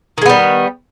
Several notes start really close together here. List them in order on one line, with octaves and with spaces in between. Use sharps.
D#3 G#3 B3 G3